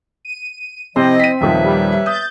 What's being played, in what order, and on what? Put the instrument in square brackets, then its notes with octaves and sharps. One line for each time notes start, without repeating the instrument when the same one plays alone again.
[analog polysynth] D#7
[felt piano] C3 C5 [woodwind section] F3 E4 D#5 [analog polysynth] C4
[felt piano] B6 D#7
[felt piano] D#1 D#3 F3 [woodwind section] B4 C#5 E5
[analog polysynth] G3
[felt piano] D#6 [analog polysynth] G6 A6